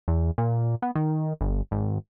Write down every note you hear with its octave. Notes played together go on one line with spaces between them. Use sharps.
E2
A#2
B3
D#3
G1
G#1